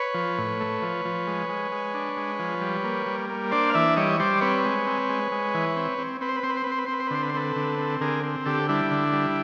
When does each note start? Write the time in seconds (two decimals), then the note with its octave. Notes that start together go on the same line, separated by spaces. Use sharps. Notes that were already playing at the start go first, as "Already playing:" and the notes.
Already playing: B4 C#5
0.14 F3
0.38 A2
0.60 A3
0.82 F3
1.05 F3
1.27 G#3
1.49 G#3
1.72 G#3
1.94 D4
2.17 G#3
2.39 F3
2.61 G3
2.84 A#3
3.06 G3
3.30 A#3
3.51 D4 C5 D5
3.70 F5
3.74 E3 D5 E5
3.96 G3 C#5 D#5
4.19 G3 C5 D5
4.41 C4 B4 C#5
4.65 G#3
4.86 C4
5.09 G#3
5.32 G#3
5.54 E3
5.76 C4
5.98 C4
6.21 C4 B4
6.29 C5
6.36 B4
6.43 C4 C5
6.49 B4
6.57 C5
6.64 C4 B4
6.72 C5
6.78 B4
6.86 C4 C5
6.93 B4
7.00 C5
7.07 B4
7.11 D3 C5
7.22 B4
7.29 C5
7.34 C4 A4 B4
7.56 D3
7.79 C4
8.01 D3 G#4 A#4
8.24 C4
8.46 D3 G4 A4
8.69 G3 D4 E4
8.91 D3
9.13 G3